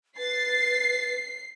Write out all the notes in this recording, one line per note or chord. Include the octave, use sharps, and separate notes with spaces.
B4 A6 C7